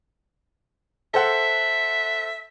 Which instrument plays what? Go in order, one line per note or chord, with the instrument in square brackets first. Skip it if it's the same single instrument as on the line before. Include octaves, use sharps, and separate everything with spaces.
[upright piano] A4 C5 F#5 [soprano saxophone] E5